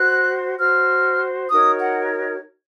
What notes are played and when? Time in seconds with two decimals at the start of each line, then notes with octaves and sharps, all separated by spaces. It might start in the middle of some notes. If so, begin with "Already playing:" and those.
Already playing: F#4 C5 F#6
0.58 F#4 C5 F6
1.49 D#4 F#4 A#4 C#5 D#6
1.80 F#5